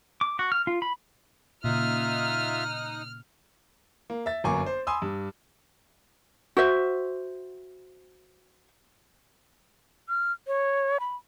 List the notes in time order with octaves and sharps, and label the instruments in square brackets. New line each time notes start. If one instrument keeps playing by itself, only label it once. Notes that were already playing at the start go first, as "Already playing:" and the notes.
[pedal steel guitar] D6
F#4
F6
F4
B5
[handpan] A#2 C#3 [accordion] D#4 D#6 F#6 [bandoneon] F4 E5 [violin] F6
[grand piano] A#3
E5 A6
G1 F#2 A#3 G#5 C#6 D6
C5
G#5 B5 C6 D#6 E6
G2
[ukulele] F#4 C5 E5
[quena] F6
C#5
B5